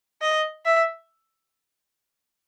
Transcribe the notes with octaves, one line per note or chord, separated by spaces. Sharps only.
D#5
E5